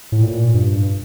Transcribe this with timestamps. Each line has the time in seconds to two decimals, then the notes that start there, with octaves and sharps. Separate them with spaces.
0.12 A2
0.23 A#2
0.54 G2